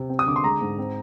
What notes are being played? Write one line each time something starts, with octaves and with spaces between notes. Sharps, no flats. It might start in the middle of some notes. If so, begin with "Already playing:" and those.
Already playing: C3
C4
D#6
D3 D6
C6
G#3 A#5
G#2
C4